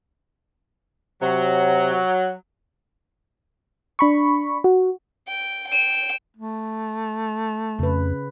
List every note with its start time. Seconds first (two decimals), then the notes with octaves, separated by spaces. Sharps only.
1.21 C3 F#3
3.99 D4 B5 C#6
4.64 F#4
5.27 G5
5.68 G5 E7
6.37 A3
7.79 F2 C#3 B4